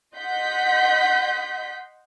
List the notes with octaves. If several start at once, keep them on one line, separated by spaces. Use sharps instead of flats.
D#5 F#5 C6 G6 B6